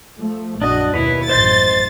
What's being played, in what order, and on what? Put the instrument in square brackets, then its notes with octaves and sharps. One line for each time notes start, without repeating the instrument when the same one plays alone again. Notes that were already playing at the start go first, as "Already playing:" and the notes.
[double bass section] F3 A3
[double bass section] A#1 F#2 [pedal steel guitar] D4 F#4 [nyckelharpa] D#5
[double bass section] D#2 B2 [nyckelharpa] E4 [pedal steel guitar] B4 C#5
[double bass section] A1 F#2 [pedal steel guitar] C5 D#5 G6 [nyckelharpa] C6 [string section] A6